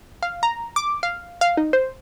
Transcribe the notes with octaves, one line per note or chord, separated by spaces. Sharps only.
F5
A#5
D6
F5
F5
D#4
C5